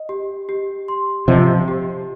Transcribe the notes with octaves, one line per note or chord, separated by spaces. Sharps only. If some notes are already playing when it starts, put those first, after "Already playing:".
Already playing: D#5
G4
G4
C6
C3 F3 D#5
G4